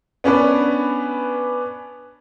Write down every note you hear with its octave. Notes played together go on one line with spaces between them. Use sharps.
B3 C#4 D4 B4